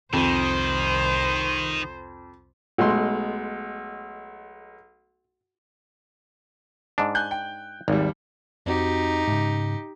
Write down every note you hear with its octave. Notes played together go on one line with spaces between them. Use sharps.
C2 F2 D#3 C5
B1 G#3 A3 C6
G#2 D4
G#5 F#6 G6
G5
G#1 D#2 G3
F2 C4 D#4 F#4 G4
G#2 C#3